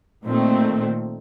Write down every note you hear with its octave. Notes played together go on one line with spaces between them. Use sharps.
A#2 D#3 A3 C4